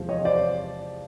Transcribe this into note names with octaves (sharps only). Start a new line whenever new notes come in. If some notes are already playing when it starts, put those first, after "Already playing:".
Already playing: E2 C3 F3 G#3
C#5 D#5
C5 D5